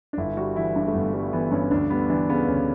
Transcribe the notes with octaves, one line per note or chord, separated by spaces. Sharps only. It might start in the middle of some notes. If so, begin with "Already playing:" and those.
D4
G1 E4
G3 F#4
E3 E4
G2 D4
A3
G1 B3
G3 A3
E3 B3
G2 C#4
D2 D4
G3 B3
E3 D4
C#3 B3
D2 C#4